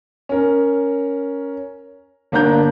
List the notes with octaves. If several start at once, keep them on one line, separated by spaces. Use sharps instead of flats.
C#4 A#4
G1 A#3 D4 A#5 G6